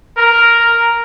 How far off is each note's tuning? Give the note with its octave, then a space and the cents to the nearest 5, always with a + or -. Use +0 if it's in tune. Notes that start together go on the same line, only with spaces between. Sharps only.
A#4 +0